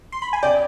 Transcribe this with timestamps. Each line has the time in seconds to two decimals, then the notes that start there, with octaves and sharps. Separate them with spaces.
0.12 C6
0.22 B5
0.33 G#5
0.43 D5 G5